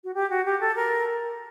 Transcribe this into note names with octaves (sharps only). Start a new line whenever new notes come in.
F#4
G4
F#4
G4
A4
A#4